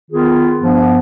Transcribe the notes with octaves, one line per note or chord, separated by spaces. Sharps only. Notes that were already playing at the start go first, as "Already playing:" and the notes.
D#3 B3 F4 G#4
G2 F3 B3